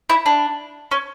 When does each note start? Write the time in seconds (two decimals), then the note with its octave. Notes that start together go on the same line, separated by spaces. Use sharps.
0.10 E4
0.26 D4
0.91 C#4